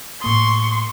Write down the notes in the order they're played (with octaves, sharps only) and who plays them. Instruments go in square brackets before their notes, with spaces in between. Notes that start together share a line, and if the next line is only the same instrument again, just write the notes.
[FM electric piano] A2 A#3 D#6 [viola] C6 C#6